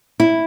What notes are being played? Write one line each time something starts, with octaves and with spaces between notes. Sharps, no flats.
E4